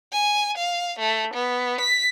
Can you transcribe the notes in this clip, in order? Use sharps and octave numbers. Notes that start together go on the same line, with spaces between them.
G#5
F5
A3
B3
B6